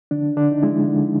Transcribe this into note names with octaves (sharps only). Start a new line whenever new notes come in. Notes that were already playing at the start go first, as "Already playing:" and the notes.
D3 D4
D3 D4
D#4
G#3 E4
D3